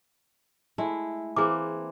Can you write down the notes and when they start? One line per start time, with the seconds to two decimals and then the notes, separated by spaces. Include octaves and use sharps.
0.78 G#3 A3 E4
1.36 E3 A#3 C4 G#4 D6